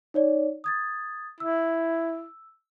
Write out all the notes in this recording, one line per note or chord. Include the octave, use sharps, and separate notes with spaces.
D#4 C#5 D5
D#6 G#6 A6
E4 E6